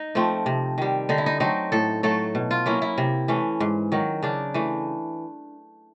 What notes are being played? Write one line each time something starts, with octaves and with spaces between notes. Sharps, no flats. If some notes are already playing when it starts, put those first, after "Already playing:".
Already playing: D#4
F3 A3 C4
C3
D#3 G3
D3 D#4
E4
D#4
F#3 A3 C4 D#4
A2 A4
F#3 A3 A4
B2
F4
F#3 A#3 C#4 E4
E4
C3
E3 A3 C#4
G#2
D#3 F#3
C#3 D4
E3 A3